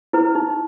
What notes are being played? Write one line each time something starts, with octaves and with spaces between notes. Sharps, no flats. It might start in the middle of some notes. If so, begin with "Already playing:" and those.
E4 B4
D#4